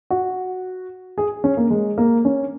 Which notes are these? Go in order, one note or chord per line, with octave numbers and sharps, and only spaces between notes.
F#4
G#4
C#4
A#3
G#3
A#3
C#4